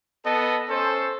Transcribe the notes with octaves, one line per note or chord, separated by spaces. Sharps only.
B3 A4 D#5 A5
C#4 A4 C5